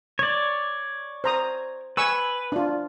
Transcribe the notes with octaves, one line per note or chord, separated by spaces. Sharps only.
C#5 D5
C5 A#5 D#6
B4 G#5 C#6 E6
D4 F4